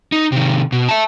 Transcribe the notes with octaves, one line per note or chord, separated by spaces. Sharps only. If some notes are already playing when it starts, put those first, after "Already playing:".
D#4
C3 D#3
B2
E5 A5